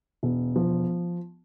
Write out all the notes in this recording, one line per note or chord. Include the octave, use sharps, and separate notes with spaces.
E1
F3